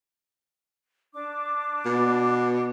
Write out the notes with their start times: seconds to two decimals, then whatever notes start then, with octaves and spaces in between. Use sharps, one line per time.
1.14 D4 D6
1.86 B2